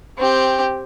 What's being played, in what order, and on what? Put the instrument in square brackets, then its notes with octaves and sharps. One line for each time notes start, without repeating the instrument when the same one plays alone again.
[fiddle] C4 G4